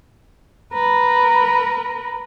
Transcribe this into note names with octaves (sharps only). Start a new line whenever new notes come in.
A#4 B4